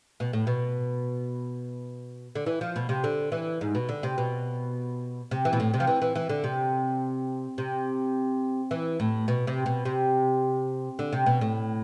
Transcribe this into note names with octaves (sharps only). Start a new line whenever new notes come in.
B2
A2
B2
D3
E3
F3
B2
C3
D3
E3
G#2
B2
D3
C3
B2
C3
E3
B2
A2
C3
F3
E3
E3
E3
D3
C3
C3
E3
A2
B2
C3
B2
C3
D3
C3
B2
A2